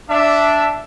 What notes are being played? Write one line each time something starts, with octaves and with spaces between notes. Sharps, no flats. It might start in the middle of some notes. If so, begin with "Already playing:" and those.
D4 E5